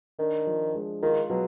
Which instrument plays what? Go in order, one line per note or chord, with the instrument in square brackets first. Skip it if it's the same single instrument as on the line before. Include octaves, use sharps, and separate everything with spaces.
[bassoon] D#3 [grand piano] D4
[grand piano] F3
G#3
[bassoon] D#3 [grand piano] F4
[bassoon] B2 [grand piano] F#3